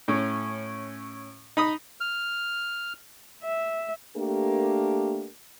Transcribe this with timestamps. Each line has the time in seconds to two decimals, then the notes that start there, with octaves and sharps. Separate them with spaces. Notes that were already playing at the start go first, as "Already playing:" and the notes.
0.08 A2 C#4
1.57 D#4 B5 D#6
2.00 F6
3.43 E5
4.16 A3 A#3 D4 G4 A#4